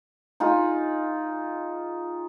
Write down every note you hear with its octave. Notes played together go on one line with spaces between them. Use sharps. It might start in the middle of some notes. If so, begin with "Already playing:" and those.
D#4 F4 G#4